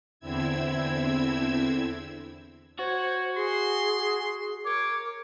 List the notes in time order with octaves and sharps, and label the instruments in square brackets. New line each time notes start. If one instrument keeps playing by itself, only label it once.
[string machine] E2 D3 C4 E4 E6 G#6
[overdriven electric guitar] F#4 [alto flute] C5 [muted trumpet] C#5
[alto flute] G#4 [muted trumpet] C6
[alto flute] A#4 [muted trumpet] C#5 [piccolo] D6